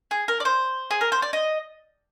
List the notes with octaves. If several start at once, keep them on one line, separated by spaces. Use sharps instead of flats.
G#4
A#4
D5
C5
G#4
A#4
C5
D5
D#5